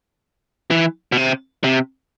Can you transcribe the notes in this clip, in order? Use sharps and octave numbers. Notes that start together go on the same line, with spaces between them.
E3
B2
C3
C3